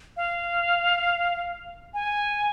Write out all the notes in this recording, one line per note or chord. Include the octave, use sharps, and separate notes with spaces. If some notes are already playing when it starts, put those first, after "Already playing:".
F5
G#5